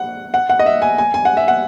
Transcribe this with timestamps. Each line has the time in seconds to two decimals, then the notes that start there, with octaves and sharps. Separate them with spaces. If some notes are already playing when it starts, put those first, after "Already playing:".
Already playing: F#5
0.34 F#5
0.49 F#5
0.59 D#5
0.66 E5
0.82 G#5
0.98 G#5
1.14 G#5
1.25 F#5
1.37 E5
1.48 F#5